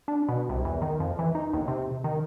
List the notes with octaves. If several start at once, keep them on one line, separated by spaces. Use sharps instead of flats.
D4
B2
C2
E2
D#3
F2
E3
D#4
D#2
C3
D#3